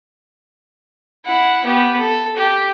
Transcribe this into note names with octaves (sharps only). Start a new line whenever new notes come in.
E4 F#5
B3 G4
A4
G4